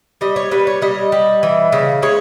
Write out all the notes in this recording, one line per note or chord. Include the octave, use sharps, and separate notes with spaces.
G3 D#5
C#5
G3 B4
C#5
G3 D#5
G3
E3
C#3
G#3 C#5